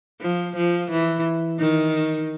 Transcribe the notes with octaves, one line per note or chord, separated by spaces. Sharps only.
F3
F3
E3
D#3